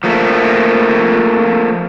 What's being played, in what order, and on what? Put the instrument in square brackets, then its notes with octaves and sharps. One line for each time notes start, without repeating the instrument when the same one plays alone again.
[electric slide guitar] F3 A3 A#3